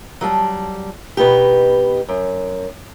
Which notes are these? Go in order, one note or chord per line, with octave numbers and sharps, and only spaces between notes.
F#3 G3 A5
B2 B3 D#4 G4
F#2